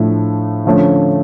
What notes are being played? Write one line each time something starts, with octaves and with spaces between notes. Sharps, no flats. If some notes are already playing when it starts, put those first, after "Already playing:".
Already playing: A2 F3 A3 D4
D3 F3 A3 C#4 F4